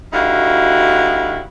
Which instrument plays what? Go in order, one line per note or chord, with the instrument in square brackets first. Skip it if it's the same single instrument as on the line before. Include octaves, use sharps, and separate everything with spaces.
[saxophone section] D2 G3 D#4 E4 F#4 F5